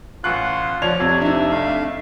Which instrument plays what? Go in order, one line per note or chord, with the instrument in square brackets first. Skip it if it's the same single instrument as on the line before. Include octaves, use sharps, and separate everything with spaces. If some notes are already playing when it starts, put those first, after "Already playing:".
[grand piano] A1 C#6 F#6 [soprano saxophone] F4 [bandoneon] F#5
[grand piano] F3 F7 [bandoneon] F4 [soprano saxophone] C#5 [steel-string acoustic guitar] D5
[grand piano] F2 [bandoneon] C3
[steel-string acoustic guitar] D4 D#4 [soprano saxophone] E5
[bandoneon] A3 F5